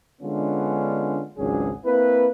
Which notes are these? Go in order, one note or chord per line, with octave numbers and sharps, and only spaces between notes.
D3 G#3 B3 C#4 D4 F4
G#1 C#2 F#3 C#4 D4 G#4
A#3 C4 E4 B4